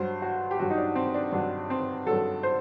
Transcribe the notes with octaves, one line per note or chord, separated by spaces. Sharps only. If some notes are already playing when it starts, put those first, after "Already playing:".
Already playing: G2 F#3 C5
F#4
G4
G2 F#3 F#4
D#4
D4
C4
D4
G2 F#3 D4
C4
G2 F#3 A4
C5